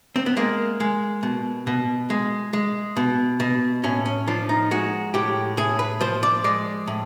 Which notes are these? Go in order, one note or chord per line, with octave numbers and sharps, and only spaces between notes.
C4
B3
G#3 A#3
G#3
B2
B2
G#3
G#3
B2
B2
A2 C#4
C#4
F3 D4
D#4
G#3 F#4
A2 G4
A2 G#4
B4
F3 C5
D5
G#3 D5
A2